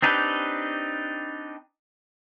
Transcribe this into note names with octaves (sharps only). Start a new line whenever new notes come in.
C4 D4 D#4 G4 B4